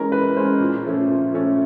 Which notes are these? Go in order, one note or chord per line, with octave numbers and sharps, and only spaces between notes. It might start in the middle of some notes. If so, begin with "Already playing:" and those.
Already playing: E3 G#3 C#4 A#4
E3 B4
G#3 C#4 C5
A#2
F3 A3 C#4
A#2
F3 A3 C#4